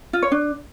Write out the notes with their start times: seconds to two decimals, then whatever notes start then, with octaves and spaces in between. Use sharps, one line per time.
0.13 F4
0.22 C#5
0.32 D4